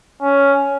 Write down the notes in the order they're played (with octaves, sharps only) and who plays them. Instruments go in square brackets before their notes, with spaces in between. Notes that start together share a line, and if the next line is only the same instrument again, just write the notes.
[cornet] C#4